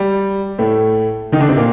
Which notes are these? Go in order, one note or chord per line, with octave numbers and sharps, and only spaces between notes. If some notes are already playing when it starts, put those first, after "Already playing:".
Already playing: G3
A2 A3
D#3 D#4
D3 D4
C3 C4
A#2 A#3